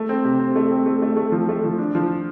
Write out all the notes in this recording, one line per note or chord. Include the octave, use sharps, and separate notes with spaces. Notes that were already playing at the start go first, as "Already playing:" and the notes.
Already playing: A3
C4
C3
C4
A3
C4
A3
A3
A3
F3
A3
F3
D4
F3